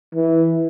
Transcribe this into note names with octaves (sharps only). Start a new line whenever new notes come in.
E3